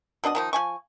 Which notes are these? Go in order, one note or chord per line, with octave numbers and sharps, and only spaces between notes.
B2 D4 D#5 F#5
D#3 F3 D#4
F3 G#5 C#6